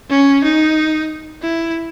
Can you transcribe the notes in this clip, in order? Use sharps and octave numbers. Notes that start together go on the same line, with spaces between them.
C#4
D#4
E4